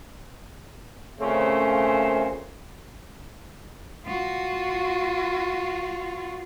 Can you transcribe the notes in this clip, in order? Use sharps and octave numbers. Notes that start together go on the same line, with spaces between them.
A#2 C#3 A3 C4 C#4 C5
F4 F#4